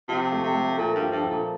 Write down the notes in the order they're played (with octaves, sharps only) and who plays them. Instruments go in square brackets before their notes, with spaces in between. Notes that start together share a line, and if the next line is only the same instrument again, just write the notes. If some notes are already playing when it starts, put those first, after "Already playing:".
[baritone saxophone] C3 [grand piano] F3
[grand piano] A3
[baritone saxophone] C3
[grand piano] A3
[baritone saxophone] A#2 [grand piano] A4
[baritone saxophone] G2
[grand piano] F3
[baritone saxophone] G2
[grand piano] A4
[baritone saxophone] A#2